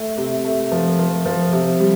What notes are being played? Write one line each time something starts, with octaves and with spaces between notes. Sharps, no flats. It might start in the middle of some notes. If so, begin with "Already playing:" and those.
Already playing: A3
C3
A3
F3
F3
F3
C3
G3